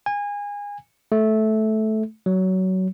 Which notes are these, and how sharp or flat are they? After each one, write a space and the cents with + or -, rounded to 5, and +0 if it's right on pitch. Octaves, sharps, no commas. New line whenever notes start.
G#5 -25
A3 -15
F#3 +20